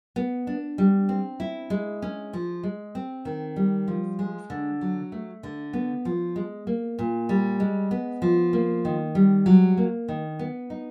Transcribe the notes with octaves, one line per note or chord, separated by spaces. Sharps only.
B3
D4
G3
C4
E4
G#3
C#4
F3
G#3
C4
D#3
G3
F3
G#3
D3
F#3
A3
D3
B3
F3
G#3
A#3
A#2
G3
G#3
B3
F3
A#3
D#3
G3
F#3
A#3
D#3
B3
D#4